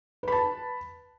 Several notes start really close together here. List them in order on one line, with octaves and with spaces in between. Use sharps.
B4 B5 A5